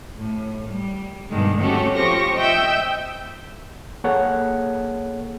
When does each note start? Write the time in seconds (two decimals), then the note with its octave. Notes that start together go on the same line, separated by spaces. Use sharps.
0.16 A2
0.68 G3
1.29 G2 B2 D3 D#3 G3 G#3
1.61 A3 C4 C#4 F#4 G4 A4
1.93 F3 G4 C#6 A#6
2.36 D#5 E5 G5 E6 G6
4.04 A#3 G#4 A4 C#5 F#5